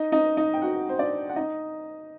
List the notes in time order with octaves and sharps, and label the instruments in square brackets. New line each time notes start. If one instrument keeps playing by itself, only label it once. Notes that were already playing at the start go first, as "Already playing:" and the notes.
Already playing: [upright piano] D#4 D#5
D#4 D#5
D#4 D#5
G5
F#4 F#5
C5
D4 D5
F#5
D#4 D#5